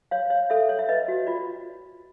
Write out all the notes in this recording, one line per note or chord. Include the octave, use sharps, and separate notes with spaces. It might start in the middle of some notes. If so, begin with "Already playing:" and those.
C#5 F5
C#5
A4 E5
C#5
E5
B4 D#5
F#4
F4 D5